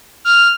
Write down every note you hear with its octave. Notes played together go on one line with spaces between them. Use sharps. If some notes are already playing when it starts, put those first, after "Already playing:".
F6